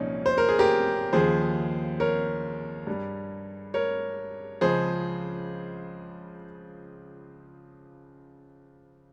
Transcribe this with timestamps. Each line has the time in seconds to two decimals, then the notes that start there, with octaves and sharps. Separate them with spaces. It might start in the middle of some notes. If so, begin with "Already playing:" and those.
Already playing: C2 A#2 F3 C#4 D#4
0.26 C5
0.38 A#4
0.49 G#4
0.59 G4 A#4
1.13 D#2 C#3 F3 G#4 C5
2.00 A#4 C#5
2.87 G2 G3
3.74 A#4 C#5
4.61 C#2 C#3 F3 G#4 C5